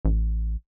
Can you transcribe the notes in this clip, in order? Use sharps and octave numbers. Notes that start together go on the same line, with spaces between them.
A1